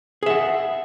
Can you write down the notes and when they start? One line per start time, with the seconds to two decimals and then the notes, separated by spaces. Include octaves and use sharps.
0.23 G#4
0.26 E5
0.30 F#5